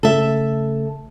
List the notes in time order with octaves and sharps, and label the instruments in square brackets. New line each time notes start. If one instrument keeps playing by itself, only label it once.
[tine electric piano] C#3 A3 [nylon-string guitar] A4 E5